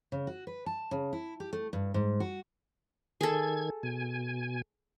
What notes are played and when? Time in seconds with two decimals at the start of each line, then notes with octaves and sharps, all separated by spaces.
0.12 C#3
0.27 F#4
0.47 B4
0.66 A5
0.91 C#3
1.13 E4
1.40 G4
1.53 A3
1.73 G2
1.94 G#2
2.20 F#4
3.21 D#3 G#4 A4 G#6
3.83 B2 G#5